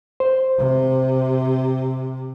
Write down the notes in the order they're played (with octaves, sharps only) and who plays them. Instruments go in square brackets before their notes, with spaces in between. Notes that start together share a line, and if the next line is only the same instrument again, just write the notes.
[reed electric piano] C5
[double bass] C3